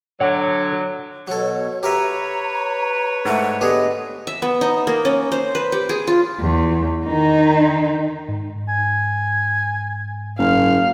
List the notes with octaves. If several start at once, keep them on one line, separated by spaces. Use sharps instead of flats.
D3 F#3 C#5 F#5
B2 F#3 A4 C#5
G4 A#4 B4 C#5 E5 A#5
G#2 A3 F#5
D3 B3 G4 G#4 D#5
E5
B3
D#4
A#3
C#4
C5
B4
G4
G#4
F4
E2
D#3 D#4
G#2
G#5
F#1 F5